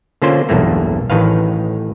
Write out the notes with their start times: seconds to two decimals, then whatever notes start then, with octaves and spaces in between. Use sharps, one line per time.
0.22 D3 A#3 C#4 F4 C5
0.49 B1 E2 G2 A3 A#3
1.10 A1 A2 D#3 B4 F5